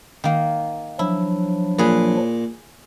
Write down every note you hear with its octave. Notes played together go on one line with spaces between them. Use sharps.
D#3 A#3
F3 F#3 D4 E4
A#2 G#4 B4